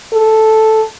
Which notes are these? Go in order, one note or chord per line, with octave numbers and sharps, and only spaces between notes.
A4